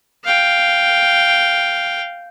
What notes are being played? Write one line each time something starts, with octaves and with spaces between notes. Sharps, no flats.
F5 G5